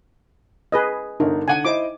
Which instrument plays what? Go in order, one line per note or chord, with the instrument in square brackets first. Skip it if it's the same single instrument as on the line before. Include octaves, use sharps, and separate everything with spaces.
[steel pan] G#4 B4 D#5
[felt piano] G1 D3 A#4 [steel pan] D#4
[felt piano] D3 F#5 D#7 [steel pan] G#5
[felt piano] E4 C5 D#5 [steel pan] D6